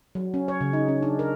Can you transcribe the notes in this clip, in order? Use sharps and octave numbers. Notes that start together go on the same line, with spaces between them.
F#3
C#4
C#5
C#3
D#4
C#4
D4
A#4